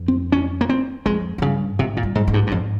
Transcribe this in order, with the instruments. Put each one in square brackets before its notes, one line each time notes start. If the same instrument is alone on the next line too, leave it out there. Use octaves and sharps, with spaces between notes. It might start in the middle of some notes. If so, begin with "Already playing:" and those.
Already playing: [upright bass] F2
[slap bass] C4
C#4
A#3
C4
[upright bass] F2 [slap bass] G#3
[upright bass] F2
[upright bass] G2 [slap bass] C#3
[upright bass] G#2 [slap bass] C3
[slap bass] A#2
[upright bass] G2
[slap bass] G#2
[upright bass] G#2
[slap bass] G2
G2
[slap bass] F2 [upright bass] G#2